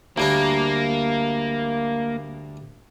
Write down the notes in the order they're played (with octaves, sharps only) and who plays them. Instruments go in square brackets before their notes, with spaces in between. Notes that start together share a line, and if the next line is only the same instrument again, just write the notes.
[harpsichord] D2 G3 D4 [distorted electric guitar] A#3